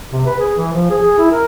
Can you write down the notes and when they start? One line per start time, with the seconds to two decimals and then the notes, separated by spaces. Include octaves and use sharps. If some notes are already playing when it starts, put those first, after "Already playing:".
0.12 C3
0.26 B4
0.39 G#4
0.57 E3
0.73 F3
0.90 G#4
1.03 G#4
1.18 E4
1.32 A#4